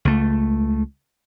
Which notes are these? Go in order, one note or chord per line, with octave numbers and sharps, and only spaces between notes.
C#2 A3